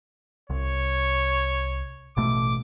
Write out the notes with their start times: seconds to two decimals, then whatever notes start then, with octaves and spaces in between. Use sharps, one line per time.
0.50 C2 C#5
2.17 A1 B2 A3 D6